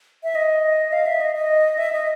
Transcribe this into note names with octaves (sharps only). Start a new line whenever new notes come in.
E5
D#5
F5
E5
D#5
D#5
E5
D#5